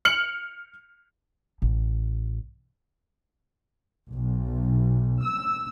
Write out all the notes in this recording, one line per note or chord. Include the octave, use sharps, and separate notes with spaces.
F6 C#7 F#7
A1
B1
E6